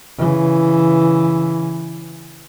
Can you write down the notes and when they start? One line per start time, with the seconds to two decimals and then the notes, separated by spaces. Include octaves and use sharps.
0.18 C#3 E3